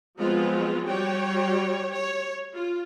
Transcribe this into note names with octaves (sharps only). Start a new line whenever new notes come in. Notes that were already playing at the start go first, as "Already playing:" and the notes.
F3 F#3 G#3 B3 C4 F4
G3 F#4 C#5 G5
C#5
F4